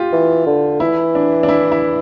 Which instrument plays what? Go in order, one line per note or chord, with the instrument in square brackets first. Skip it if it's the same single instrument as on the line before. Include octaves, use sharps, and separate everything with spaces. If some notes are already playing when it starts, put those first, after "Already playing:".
Already playing: [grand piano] F4 G4
[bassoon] E3
D3
[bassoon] E3 [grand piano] E4
[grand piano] D4
D4
E4
E4